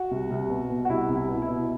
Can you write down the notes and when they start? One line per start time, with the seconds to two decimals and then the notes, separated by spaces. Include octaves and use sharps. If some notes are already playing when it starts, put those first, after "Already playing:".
Already playing: F#4
0.11 C2
0.30 C2
0.50 B2
0.70 B2
0.85 F#4
0.89 C2 E4
1.09 C2
1.16 E4
1.29 B2
1.42 E4
1.48 B2